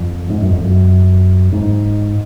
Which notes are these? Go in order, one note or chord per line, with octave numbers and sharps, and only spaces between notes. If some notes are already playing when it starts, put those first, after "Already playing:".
Already playing: F2
G#2
F#2
F2
F#2
G#2